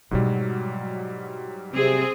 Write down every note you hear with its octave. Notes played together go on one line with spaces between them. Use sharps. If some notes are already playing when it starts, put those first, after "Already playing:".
G#2 B2 F#3 G3 E4
C3 C4 G#4